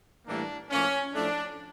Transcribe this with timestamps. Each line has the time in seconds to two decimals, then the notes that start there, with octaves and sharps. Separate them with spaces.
0.26 A2 E3 G3 A#3 D4
0.69 A2 F3 A#3 C#4
1.13 A2 F3 A3 D4